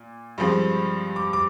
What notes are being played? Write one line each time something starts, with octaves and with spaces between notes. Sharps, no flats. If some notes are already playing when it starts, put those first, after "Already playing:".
Already playing: A#2
G2 F3 G#3 C4
D6
D6